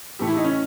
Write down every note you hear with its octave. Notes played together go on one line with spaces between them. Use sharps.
A2 E3 A3 G4
E4
D#4
C#4